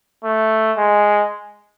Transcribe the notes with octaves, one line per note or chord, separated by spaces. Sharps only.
A3
G#3